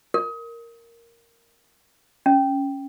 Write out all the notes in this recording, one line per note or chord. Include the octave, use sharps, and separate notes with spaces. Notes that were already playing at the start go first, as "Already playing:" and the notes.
A#4
C#4